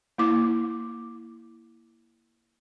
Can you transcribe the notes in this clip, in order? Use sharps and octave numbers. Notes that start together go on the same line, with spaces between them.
A#3 E4 D6